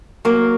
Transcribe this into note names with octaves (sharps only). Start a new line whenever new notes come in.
F#3 A#3